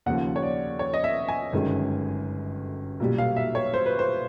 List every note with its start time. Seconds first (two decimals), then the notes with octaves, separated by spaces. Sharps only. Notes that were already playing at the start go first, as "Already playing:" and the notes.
0.06 D#2 C#3 F3 F#5
0.36 C#5
0.43 D5
0.79 C#5
0.94 D#5
1.04 E5
1.28 G#5
1.53 G1 F#2 D#3 G#3
3.00 B1 A#2 G3
3.18 F5
3.36 E5
3.55 C#5
3.74 C5
3.86 B4
3.99 C5